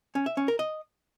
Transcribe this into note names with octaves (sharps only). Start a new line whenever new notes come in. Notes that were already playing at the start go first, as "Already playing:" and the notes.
C#4
E5
C#4
A#4
D#5